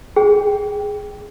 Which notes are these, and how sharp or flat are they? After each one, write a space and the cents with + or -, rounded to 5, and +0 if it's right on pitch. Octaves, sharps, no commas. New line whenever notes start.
G#4 +0 G5 +0